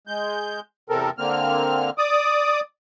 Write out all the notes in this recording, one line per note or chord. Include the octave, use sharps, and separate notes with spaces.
G#3 G6
E2 C3 C4 A4 A#4
D3 A#3 C4 F6
D5 D6 D#6